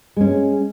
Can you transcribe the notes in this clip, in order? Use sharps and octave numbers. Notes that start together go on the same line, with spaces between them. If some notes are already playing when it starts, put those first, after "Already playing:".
G#3 C#4